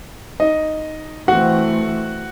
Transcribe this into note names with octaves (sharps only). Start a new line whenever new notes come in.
D#4 D#5
E3 A3 C4 F#4 F#5